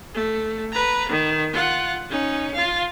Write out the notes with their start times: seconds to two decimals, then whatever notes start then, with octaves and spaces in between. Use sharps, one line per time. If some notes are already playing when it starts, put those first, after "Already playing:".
0.14 A3
0.72 B4 A#5
1.08 D#3
1.53 F4 F#5
2.10 C#4 D#4
2.55 F4 F5